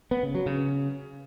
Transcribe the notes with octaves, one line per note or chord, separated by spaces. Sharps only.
B3
C#3
F#3
C#3